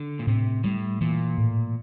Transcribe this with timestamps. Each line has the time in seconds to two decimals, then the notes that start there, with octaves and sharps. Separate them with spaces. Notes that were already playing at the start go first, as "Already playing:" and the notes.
Already playing: D3
0.19 A#2
0.27 A2 C3
0.64 A2 G3
1.01 A#2 E3
1.38 A2